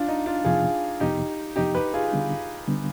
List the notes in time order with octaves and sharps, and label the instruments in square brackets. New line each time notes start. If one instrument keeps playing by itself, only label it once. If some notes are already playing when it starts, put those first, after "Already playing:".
Already playing: [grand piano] D4 F4
D#4
D4 F4
[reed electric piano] F2 C3 F3 B3 [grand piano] F4 G#4
[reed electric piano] F2 C3 F3 B3 [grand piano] D#4 G4
[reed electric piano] F2 C3 F3 B3 [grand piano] D#4 G4
[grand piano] G4 B4
F4 G#4
[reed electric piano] D3 G3 B3 D4
D3 G3 B3 D4